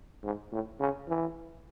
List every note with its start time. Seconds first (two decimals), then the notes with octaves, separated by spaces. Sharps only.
0.24 G#2
0.52 A2
0.80 C#3
1.08 E3